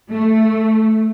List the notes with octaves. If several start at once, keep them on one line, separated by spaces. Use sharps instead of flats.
A3